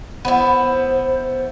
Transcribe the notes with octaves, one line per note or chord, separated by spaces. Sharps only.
B3 E4 C5